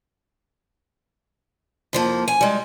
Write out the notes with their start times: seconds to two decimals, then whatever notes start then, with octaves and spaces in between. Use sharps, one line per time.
1.93 F2 F3 A#3
2.28 G#5
2.41 G3 G#3